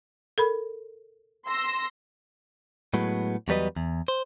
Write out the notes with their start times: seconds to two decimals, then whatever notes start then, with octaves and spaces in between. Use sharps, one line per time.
0.38 A4 A#4 B5
1.47 C6 E6 A#6
2.94 A2 F#3 G#3 B3
3.48 E2 F#3 G3 B4 D#5
3.77 E2
4.08 C5